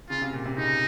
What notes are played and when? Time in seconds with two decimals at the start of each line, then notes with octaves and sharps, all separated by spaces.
0.10 C#3 F4
0.21 C3
0.33 A#2
0.45 C3
0.57 C#3 D#4